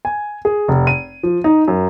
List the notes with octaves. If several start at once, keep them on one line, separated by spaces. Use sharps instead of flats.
G#5
G#4
F1
D#7
F3
D#4
F#2